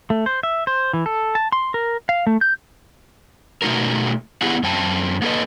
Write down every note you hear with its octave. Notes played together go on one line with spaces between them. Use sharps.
A3
C5
E5
C5
E3
A4
A5
C6
A#4
F5
A3
G6
B2 A3 D#4 F#4 A#4
B3 E4 G4 G#4 F#5
F#2 C4 G5 A5
A#3 A4 B4 D#5